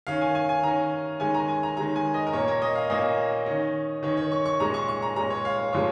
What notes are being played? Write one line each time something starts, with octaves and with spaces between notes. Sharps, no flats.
D#3 C#4 F5
G#5
G#5
G#5
D#3 C#4 A#5
D#3 G#3 C#4 G#5
A#5
G#5
A#5
D#3 G#3 C#4 A#5
G#5
D#5
A#4
A#2 A#3 C#4 C#5
A#4
D#5
F5
A#2 A#3 C#4 D#5
D#3 C#4
D#3 C#4 C#5
C#5
C#6
C#6
A#2 G#3 C#4 A#5
C#6
C#6
A#5
A#2 G#3 C#4 A#5
C#5
F5
C#5
A#2 F3 G#3 C#5